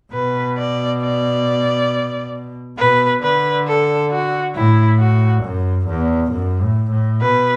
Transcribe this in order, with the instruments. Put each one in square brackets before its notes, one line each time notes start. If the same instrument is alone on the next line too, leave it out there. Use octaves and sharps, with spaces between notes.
[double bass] B2 [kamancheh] B4
[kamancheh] D5
D5
[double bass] B2 [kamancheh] B4
[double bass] D3 [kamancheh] B4
[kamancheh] A4
F#4
[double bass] A2 [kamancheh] E4
[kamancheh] F#4
[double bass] F#2
E2
F#2
A2
A2
[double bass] B2 [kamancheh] B4